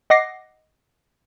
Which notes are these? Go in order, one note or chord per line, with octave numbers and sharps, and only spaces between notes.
D#5 F#5 D6 A#6 C7